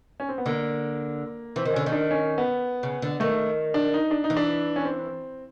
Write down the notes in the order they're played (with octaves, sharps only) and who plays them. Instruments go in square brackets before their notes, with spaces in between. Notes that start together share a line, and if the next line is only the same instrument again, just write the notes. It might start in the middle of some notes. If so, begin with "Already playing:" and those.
[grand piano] C#4
C4
B3
[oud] D3 [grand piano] A#3
[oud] E3 [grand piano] C4
[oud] D#3
[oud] D3 [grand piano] C#4
[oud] D#3
[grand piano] D4
C#4
B3
[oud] C#3
D3
[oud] D#3 [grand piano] A3
[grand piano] D4
D#4
D4
D#4
[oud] E3
[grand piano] D4
C#4
C4